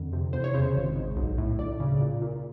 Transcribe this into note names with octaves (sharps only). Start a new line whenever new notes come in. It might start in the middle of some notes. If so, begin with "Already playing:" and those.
Already playing: F2 D3
C3
E2 C5
C#5
C#3 C5
G#1
G#2
B1
A2
D2 D5
C#3
A#2
A#2